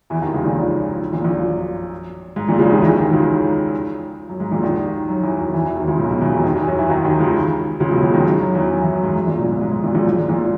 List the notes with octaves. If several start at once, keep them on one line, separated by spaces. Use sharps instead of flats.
E2 E3
D#2 D#3
C#2 C#3
A#1 A#2
A#1 A#2
A#1 A#2
F#2
G#2
A#1 A#2
C#2 C#3
D#2 D#3
E2 E3
D#2 D#3
C#2 C#3
F#2
G#2
A#1 A#2
D#2 D#3
F#2 F#3
E2 E3
F#2 F#3
E2 E3
E2 E3
D#2 D#3
C#2 C#3
B1 B2
B1 B2
E2 E3
D#2 D#3
D#2 D#3
E2 E3
F#2 F#3
E2 E3
D#2 D#3
D#2 D#3
C#2 C#3
C#2 C#3
B1 B2
C#2 C#3
D#2 D#3
F#2 F#3
F#2 F#3
E2 E3
F#2 F#3
E2 E3
F#2
G#2
F#2
A#1 A#2
B1 B2
G#2
G#2
G#2
A#1 A#2
A#1 A#2
F#2
G#2
A#1 A#2